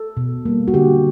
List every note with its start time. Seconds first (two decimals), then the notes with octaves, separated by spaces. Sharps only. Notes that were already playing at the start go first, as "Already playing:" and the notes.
Already playing: A4
0.17 B2
0.45 G3 A#3
0.68 F#4
0.74 D3 G4